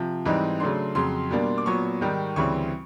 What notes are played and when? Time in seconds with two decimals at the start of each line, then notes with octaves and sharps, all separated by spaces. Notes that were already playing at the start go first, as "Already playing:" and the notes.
Already playing: C3 F3
0.25 G#2 E3 G3 C4 D#4
0.60 C#3 F#3 A3 D4 C6
0.95 F2 C#3 F#3 C6
1.30 B2 G3 A#3 D4
1.58 D6
1.66 A#2 F#3 B3 C#6
2.01 G#2 D#3 G3
2.36 D2 C#3 E3 G3 C4 C#6